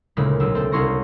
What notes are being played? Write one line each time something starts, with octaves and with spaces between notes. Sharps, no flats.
D2 A#2 C#3 G#3 E4 B6
B1 D4 E6
C4 A4
C2 C#4 E4 C6 C#6 A#6